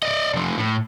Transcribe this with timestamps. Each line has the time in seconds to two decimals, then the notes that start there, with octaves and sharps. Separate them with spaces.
0.03 D5 D#5
0.34 F3 A3
0.58 A2